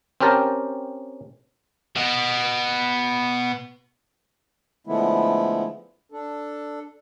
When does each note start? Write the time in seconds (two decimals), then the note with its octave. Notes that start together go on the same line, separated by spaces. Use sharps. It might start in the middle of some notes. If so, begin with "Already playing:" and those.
0.21 C4 C#4 G4 A#4 A5
1.96 B2 B3
4.87 D3 F3 G#3 A3 B3 E4
6.12 D4 A4